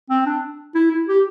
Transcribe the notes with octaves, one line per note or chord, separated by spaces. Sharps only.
C4
D4
E4
E4
G4